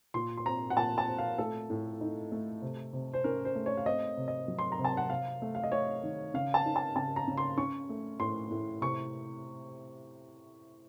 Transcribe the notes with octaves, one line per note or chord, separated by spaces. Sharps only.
A#2 C6
C6
C4 A#5
F#5
A#2 A5
A5
C4
F5
A3 A4
A2
D#4
A3
C3
C3
C5
C#4 A#4
C5
A3
C#5
F5
C4 D#5
C3
D#5
F#3
C6
A#5
C3
A5
F#5
C3 F5
A3
F5
D#5
A3 C#5
D#3
C#3 F5
A5
D#4
A5
C#3 A5
A#5
C#3
C6
C#4 C#6
A3
A2 C6
A2
C3 C#6